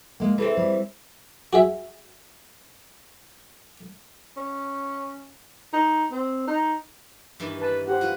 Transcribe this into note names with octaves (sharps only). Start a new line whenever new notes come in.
G#3 A#3
E3 G#3 C4 A4
G3
F#4 G#4 E5
C#4
D#4
C4
D#4
G2 D#3 E3
B4 A5
G4 C5 F#5
F4 F#4 B4